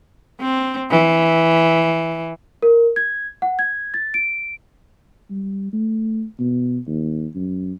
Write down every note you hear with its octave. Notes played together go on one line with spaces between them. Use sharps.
C4
E3
A#4
G#6
F#5
G#6
A6
D7
G3
A3
B2
D#2
F#2